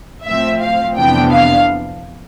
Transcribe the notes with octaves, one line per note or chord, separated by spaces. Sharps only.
A2 F3 C4 E5
F5
F2 C3 E3 B3 D4 G5
F5